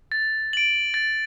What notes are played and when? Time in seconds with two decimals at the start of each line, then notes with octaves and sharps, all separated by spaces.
0.12 A6
0.53 D7 F#7
0.94 A6